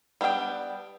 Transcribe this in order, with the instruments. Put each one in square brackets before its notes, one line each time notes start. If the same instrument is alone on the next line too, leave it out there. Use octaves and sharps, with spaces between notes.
[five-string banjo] G3 B3 D4 E5 G5